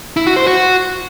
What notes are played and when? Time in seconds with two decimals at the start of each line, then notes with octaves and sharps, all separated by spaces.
0.17 E4
0.27 F#4
0.36 C5
0.46 F#4